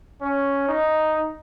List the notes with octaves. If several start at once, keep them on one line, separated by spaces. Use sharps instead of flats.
C#4
D#4